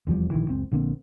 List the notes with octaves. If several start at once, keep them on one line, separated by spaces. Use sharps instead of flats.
F1 E2 F3 G3
A#1 D#2 D#3 E3
F#1 C#2 C4
A#1 D3 A#3 C4